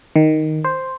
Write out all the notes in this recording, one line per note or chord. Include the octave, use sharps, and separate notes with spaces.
D#3
C5